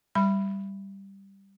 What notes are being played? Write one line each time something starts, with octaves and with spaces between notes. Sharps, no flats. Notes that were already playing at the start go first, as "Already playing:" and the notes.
G3 B5